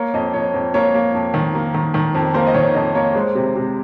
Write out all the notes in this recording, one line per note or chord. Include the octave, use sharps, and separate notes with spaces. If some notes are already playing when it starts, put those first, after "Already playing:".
Already playing: A#3 C#5
F2 D#5
F2 C#5
F2
A#3 C#5
A#3
F2
D#3
A#3
D#3
D#3
F2
A#3 C5
D#5
D#3 C#5
F2 D#5
A#3 C#5
G#3 C5
C3
C3